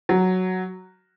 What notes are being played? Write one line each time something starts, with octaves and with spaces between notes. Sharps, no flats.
F#3